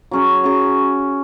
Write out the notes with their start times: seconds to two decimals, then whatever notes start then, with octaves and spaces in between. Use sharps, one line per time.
0.11 F#3 C#4 G#4
0.44 F#3 C#4 G#4